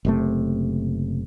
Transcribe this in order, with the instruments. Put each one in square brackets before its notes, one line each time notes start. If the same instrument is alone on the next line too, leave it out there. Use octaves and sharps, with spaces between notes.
[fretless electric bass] F#1 C3 A3